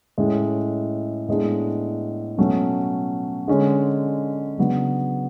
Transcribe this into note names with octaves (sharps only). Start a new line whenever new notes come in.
A2 G#3 C#4
A2 G#3 B3 D4
B2 F#3 A3 C#4
D3 G#3 C#4
C#3 F#3 B3 D4